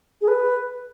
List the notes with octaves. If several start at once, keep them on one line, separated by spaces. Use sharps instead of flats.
G#4
B4